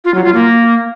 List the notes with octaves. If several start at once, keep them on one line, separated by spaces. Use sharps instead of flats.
F4
F#3
F4
A#3